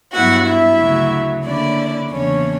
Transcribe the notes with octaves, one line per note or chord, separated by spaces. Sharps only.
G2 F#3 B3 E4 F#4 F#5
E4 E5
D2 C#3 F#3
D3 A#3 C#4 D4 E4 D5
E2 C#3 E3 A#3 C#4 D4 C#5